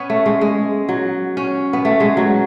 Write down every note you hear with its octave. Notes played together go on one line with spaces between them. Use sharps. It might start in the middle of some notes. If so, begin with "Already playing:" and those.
Already playing: B3 C#4
A3
G#3
G#3
F#3
C#4
B3
A3
G#3
F#3